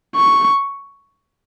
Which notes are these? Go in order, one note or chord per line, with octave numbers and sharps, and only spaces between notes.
C#6